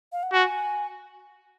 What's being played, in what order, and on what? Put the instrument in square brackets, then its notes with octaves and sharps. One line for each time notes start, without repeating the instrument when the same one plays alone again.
[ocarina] F5
F#5
[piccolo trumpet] F#4 [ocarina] G#5